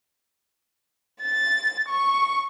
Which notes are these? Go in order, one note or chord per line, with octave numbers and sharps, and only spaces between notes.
A6
C#6